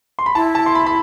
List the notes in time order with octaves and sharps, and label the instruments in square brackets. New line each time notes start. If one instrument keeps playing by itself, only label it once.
[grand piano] C6
B5
[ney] E4 [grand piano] A5
[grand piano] A5
C6
B5
B5